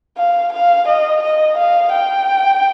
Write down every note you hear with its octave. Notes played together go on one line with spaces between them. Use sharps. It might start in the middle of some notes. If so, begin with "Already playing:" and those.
F5
F5
D#5
D#5
F5
G5